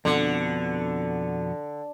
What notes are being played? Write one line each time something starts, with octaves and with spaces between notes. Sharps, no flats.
F2 B2 D3 B3